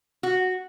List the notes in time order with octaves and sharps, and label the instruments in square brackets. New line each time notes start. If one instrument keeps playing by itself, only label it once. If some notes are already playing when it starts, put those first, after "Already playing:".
[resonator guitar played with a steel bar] F#4